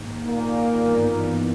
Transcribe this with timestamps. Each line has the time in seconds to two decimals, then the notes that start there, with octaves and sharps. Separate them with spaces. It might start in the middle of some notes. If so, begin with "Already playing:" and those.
Already playing: G#2 D#3 A#3 D#4
0.26 A#2 A#3
0.79 G2 E3 G3 B3 D#4